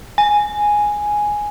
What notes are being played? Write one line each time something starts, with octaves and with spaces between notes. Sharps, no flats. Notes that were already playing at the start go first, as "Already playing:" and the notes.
G#5